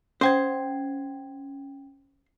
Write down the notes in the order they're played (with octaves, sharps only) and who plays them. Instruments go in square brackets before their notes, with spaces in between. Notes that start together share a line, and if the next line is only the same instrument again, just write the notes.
[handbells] C#4 G5 G#6 [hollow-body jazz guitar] C5